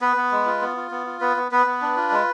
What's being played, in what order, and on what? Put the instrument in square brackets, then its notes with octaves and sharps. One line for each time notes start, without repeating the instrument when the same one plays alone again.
[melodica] B3 B4
B3
G#3
F4
B3
F4
B3
F4
B3 B4
B3
B3 B4
B3
D4
F4
G#3